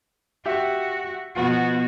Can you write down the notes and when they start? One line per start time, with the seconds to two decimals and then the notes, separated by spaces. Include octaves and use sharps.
0.46 F#4 G4 E5
1.36 B2 F3 B3 F#4